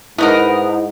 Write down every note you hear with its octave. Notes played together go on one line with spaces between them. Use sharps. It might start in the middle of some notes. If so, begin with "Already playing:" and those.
G#2 B3 D#4 E4 A#4 D#5 F#5